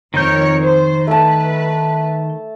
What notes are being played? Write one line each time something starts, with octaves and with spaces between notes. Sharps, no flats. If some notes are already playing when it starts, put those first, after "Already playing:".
F2 D#3 A#4 C#5 G6
C5
A3 B4 A5